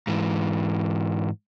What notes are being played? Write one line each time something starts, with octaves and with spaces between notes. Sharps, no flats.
G#2 E3